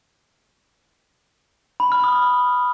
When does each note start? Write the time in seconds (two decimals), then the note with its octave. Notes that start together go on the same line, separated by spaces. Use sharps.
1.80 B5
1.92 F6
2.04 D#6